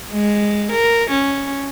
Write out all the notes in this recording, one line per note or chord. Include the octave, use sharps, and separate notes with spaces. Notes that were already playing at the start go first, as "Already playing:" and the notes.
G#3
A#4
C#4